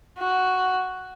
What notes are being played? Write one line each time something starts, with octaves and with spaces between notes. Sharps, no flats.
F#4